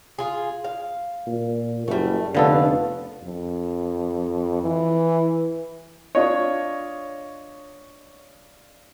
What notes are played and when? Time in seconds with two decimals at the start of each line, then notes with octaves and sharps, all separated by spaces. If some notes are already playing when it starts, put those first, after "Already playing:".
0.18 F4 G#4
0.64 F5
1.27 A#2
1.88 F#1 G3 A3
2.35 F1 D3 A3 B3 F4 A4 F5
3.24 F2
4.62 E3
6.15 D4 F4 C#5 D#5